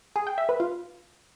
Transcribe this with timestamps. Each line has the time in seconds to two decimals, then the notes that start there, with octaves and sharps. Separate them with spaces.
0.16 G#4
0.27 G5
0.38 E5
0.49 B4
0.60 F4